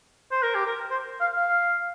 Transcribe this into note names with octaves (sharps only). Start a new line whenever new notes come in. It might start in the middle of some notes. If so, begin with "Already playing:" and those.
C5
A#4
G4
A#4
C5
F5
F5